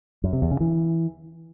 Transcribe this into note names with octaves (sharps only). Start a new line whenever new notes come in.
F#2
C3
E2
C#3
E3